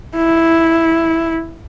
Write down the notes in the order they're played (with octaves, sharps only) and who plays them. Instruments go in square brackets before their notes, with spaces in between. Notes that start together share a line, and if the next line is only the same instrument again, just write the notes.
[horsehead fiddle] E4